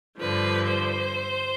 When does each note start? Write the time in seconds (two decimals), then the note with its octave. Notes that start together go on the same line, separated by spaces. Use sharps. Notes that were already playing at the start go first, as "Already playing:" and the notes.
0.18 G2 D3 F3 B4
0.66 C5